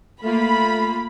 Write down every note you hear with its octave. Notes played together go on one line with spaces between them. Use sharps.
A3 A#3 F4 B5